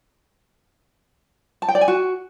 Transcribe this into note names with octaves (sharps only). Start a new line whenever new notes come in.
A5
G5
D5
G#5
F#4